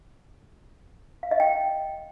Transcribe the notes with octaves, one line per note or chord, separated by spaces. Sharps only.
F5
D#5
G5